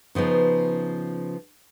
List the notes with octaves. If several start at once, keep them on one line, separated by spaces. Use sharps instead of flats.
C#3 F3 B3 D#4